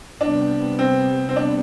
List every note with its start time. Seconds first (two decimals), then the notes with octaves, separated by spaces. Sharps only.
0.21 C3 G3 B3 D4
0.79 C4
1.29 C4
1.36 D4